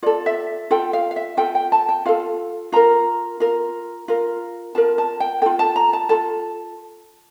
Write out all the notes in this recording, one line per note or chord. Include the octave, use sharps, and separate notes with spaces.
F4 A4 D5
E5
F4 A4 G5
F5
F5
E5
F4 A4 G5
G5
A5
G5
F4 A4 F5
F4 A#4 A#5
F4 A#4
F4 A#4
F4 A#4 A5
A5
G5
F4 A4 G5
A5
A#5
A5
F4 A4 A5